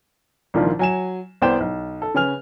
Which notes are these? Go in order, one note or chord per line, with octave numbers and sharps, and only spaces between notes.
C2 A#2 D#3 F3 D4 F4
F#3 G#5 E7
C2 B3 C5 D5 G5 E7
B1
A4
C#3 B4 C#5 G#5 F6 F7